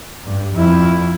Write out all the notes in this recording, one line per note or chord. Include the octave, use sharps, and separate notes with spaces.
G2
F2 E4